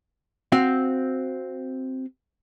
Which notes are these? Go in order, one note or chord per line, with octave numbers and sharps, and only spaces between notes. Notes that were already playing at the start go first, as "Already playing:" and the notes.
C4 F#4 F5